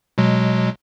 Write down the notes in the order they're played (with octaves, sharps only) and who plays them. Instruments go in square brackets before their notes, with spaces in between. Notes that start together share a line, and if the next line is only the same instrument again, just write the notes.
[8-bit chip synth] B2 F#3 G#3